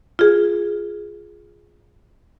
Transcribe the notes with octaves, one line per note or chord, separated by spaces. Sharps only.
F4 G#4